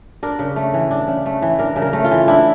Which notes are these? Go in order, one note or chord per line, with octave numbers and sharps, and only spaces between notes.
D4 A#4
C#3
A3
E3
D4
C#3
A3
E3
D4 A#4
C#3
A#4
A3
F4
E3
D4 E4